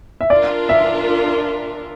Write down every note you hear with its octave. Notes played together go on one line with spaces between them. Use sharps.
E5
D4 F4 A#4 D5
E5